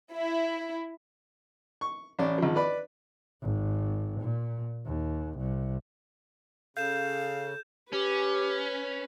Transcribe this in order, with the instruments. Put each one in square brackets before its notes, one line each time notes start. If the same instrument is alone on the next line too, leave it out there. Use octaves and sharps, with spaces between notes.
[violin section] E4
[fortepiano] C#6
A1 C#4 D5
G#1 F3
B4 D5 B5
[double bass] G#1
A#2
D#2
C2
[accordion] C#3 [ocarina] A4 [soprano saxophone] F5 [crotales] G6 E7
[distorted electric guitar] C#4 [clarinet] G4 [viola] B4